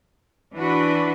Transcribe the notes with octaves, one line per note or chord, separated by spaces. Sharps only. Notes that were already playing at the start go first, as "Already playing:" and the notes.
E3 D4 F#4 B4